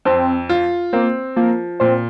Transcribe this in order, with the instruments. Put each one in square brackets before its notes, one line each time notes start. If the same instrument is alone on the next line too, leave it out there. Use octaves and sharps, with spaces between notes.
[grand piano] F2 [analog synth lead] C4
[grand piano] F4
[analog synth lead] A#3 [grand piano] C4
[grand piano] F3 [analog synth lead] A#3
[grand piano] A#2 [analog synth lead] C4